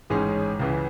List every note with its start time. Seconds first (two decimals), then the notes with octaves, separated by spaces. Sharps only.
0.10 A1 G#2 G#3 C#4 G#4
0.59 C#2 C#3 E3